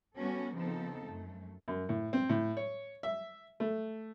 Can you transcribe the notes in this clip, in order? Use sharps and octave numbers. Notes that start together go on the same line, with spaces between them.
G3 B3 C#4 F#4 A4
C#3 F3 B3 C4 D#4 A4
F#2 A3
F#2
A2
C4
A2
C#5
E5
A3